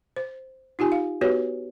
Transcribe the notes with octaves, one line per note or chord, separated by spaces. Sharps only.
C5
D#4 F4 G4 G#5
F5
B3 F#4 G4 B4 C#5